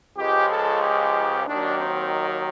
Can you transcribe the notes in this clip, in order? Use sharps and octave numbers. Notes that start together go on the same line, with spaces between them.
C#2 C#3 F3 G#3 G4
A4
G4
D#2 D#3 F#3 D4
C4